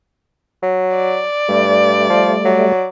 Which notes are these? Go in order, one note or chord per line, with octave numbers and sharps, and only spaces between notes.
F#3
D5
G2 G3 A3
F3
F#3